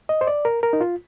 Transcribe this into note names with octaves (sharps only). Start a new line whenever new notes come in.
D#5
C5
D5
A#4
A#4
D#4
F4